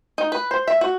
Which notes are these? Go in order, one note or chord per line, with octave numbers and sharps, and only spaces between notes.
D#4
B4
C5
E5
F#4